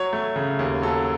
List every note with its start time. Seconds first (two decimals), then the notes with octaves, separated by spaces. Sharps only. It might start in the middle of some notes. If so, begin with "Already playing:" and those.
Already playing: F#3 C#5
0.13 A3
0.36 C#3
0.59 D#2
0.82 F#3 A4